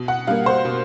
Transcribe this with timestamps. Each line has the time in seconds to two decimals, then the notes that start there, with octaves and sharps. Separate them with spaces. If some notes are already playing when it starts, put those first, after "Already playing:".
Already playing: B2
0.08 F#5
0.27 G3 A#3 F5
0.46 C5
0.65 B2